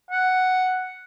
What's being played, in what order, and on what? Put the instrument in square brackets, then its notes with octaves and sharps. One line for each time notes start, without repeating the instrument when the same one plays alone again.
[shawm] F#5